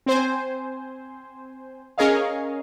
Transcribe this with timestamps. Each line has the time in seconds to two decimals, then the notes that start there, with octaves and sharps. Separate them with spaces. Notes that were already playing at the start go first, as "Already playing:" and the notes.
0.06 C4 C5 G#5
1.98 C#4 G#4 A#4 C#5 D#5 F5